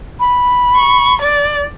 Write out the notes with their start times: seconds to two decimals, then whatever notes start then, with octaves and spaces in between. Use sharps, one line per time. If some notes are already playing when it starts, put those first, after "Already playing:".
0.19 B5
0.76 C#6
1.22 D5